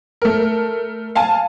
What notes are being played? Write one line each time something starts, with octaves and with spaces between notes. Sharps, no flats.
A3 A#4
F5 G#5 A5